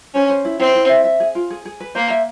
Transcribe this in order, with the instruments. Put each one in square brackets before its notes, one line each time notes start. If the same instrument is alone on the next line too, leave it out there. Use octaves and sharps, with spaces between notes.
[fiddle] C#4 [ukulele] C5
[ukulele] C5
E4
[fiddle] C4 [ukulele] E4
[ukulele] E4
E5
E5
G#4
F4
G#4
G#4
B4
[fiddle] A#3 [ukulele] C5
[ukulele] E5